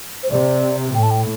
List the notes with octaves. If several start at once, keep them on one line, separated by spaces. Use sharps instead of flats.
C5
C3 D5
A2 G5
A5
G5